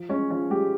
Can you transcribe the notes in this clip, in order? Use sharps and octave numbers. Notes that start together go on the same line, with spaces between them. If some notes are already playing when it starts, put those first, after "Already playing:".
Already playing: F3
G#3 C#4
F3 C#4
G#3 G4